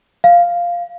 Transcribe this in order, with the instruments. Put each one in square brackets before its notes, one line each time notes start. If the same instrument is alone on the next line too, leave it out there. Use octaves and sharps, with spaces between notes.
[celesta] F5